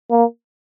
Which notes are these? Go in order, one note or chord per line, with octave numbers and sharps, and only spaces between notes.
A#3